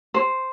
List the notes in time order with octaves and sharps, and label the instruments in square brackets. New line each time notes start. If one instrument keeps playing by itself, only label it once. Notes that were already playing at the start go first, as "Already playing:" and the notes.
[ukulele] C5